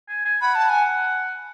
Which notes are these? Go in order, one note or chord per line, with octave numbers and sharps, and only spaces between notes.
G#5
G#5
F#5 B5
A5
G#5